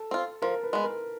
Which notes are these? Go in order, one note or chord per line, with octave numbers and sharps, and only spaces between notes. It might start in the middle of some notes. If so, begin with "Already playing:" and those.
Already playing: A4
C4 F4
F3 A#4
B4
G#3 B3
A#4